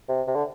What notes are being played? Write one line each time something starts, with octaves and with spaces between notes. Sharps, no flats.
C3
C3
D3